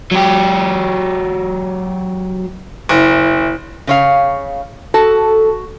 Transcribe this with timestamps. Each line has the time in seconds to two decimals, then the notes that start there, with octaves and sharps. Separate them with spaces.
0.12 F#3 G4
2.89 F#1 E4
3.87 C#3 C#5 F5
4.94 F#4 A4